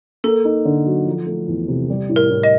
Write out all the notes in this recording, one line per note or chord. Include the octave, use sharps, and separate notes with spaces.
A#3 A4
D#4
D3
F#3
F3
A3
E2
C3
G3
A2
A#4
A2
D#5